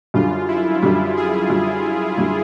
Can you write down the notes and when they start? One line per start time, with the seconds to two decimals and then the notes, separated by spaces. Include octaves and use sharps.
0.14 F#2 D3 G3 F4
0.48 E4
0.82 F#2 D3 G3 E4
1.17 G#4
1.50 F#2 D3 G3
2.17 F#2 D3 G3